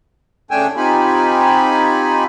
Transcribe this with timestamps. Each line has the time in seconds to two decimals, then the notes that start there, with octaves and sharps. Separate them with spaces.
0.51 C#3 A3 D4 G5 G#5 E6
0.76 C4 D#4 F4 G4 G#5 B5